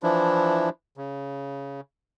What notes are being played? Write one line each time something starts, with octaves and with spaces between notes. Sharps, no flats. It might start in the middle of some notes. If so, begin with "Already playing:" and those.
E3 F3 D4 E4
C#3